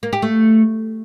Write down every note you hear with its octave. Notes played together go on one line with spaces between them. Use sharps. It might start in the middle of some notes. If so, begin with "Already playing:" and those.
A#3
G4
A3